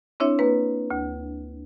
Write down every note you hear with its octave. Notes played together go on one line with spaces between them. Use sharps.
C4 D4 E4 C#5 E5
A#3 B4
D2